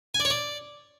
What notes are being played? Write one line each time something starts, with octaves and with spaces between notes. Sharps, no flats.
G#5
D5
C#5
D5